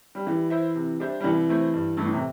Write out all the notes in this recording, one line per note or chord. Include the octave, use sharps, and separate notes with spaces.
G3
E3 G3
E4 C5 E5
C3
G3 D4 C5 E5
G3
C2 E3
C3 A3 E4 C5
G2
G2 E3 A3
A2
C3